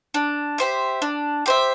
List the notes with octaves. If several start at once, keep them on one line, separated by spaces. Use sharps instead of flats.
D4
G4 C5 E5
D4
G4 C5 E5